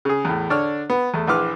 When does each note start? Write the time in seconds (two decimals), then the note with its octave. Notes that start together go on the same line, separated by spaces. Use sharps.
0.05 C#3 G#4
0.25 E2 A2
0.50 D3 D4 C#5 F6
0.90 B3
1.14 E2 A3
1.28 A#1 E3 B4 D6 F6